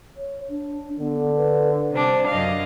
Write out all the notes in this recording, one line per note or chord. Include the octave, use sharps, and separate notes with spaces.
C#5
D4
D3 B3
B4
C3 G3 D4 C5
F#2 D4 D#5 F5